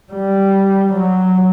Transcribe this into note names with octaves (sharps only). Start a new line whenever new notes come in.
G3
F#3